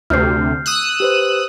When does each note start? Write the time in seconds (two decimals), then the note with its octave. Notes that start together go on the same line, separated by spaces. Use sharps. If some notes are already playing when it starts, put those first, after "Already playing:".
0.10 D2 C3 F6 G6 C7
0.66 D#6 E6 F#6
1.00 G4 B4 C5